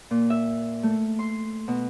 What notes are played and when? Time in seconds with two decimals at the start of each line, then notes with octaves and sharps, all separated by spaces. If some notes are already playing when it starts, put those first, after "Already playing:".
0.11 A#2
0.30 E5
0.83 A3
1.19 C6
1.68 B2